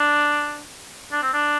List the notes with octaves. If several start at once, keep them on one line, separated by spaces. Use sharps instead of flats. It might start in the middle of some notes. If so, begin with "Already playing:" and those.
Already playing: D4
D4
C4
D4